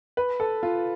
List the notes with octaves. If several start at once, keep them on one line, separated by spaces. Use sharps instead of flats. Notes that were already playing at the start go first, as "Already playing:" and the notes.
B4
A4
F4